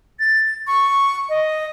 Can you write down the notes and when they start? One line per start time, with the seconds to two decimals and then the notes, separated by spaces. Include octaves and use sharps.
0.19 A6
0.67 C#6
1.29 D#5